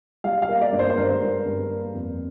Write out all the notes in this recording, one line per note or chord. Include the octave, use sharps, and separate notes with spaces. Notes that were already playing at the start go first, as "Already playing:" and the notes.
G3 F5
F5
A#3
D5
G2
C5
C5
G2 A#4
G2
G2
A#3
F2